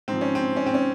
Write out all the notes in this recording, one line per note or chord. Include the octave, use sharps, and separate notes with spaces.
G#2 F3 C4
C#4
C4
C#4
C4
C#4